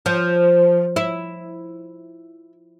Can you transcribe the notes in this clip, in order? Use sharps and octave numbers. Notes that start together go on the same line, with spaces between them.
F3
E4